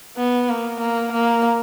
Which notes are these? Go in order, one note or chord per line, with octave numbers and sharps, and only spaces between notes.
B3
A#3
A#3
A#3